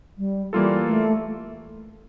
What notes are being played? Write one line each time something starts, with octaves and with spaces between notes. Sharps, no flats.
G3
E3 G3 A#3 F4 A4
A3